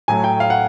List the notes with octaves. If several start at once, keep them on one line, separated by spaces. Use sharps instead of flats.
A2 F#3 A3 G#5
G5
F5
F#5